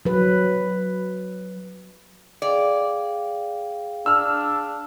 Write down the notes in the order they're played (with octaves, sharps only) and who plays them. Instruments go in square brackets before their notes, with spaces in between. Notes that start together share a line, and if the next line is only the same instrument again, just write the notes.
[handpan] F#3 B4
[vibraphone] G#4 F5 G5 [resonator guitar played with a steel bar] D5
[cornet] D4 [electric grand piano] E6 F6